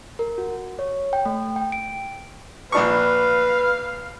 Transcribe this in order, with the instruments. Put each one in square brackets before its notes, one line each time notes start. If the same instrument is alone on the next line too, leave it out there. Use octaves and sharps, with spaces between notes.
[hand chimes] A#4
F#4
C#5
G5
A3
G5
D7
[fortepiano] A#1 D4 C#6 [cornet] B4 [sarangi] F5